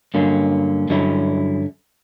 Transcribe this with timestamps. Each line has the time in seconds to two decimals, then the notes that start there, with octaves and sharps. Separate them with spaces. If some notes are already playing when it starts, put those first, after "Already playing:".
0.14 G2 D3 F#3 A#3 C#4
0.89 G2 D3 F#3 C#4 E4